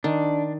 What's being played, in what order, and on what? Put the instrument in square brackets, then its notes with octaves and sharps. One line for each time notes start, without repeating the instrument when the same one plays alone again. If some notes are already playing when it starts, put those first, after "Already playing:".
[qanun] D#3 [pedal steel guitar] D4